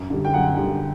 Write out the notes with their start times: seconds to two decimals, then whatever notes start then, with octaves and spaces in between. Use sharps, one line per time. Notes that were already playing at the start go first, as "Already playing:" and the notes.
Already playing: F#2
0.10 D3 G3
0.25 G5
0.34 F#2 F#5
0.57 D3 G3